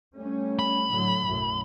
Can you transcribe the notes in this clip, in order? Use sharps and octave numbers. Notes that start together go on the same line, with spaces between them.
G3 A3 C#4
B5
A2 D3 F#3
B1 F#2 A2